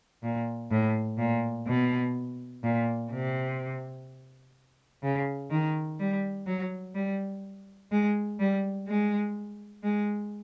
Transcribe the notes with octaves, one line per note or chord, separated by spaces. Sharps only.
A#2
A2
A#2
B2
A#2
C3
C#3
D#3
G3
F#3
G3
G#3
G3
G#3
G#3